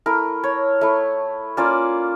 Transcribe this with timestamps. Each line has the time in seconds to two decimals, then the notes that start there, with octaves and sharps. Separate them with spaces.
0.06 A3 E4 A#4
0.44 C#5
0.81 A3 E4
1.57 A#3 C#4 F4 D5